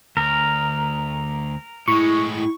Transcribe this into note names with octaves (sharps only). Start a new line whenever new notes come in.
D2 A#4
A2 G#3 E4 C#6